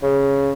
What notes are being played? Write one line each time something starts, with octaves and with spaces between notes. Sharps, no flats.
C#3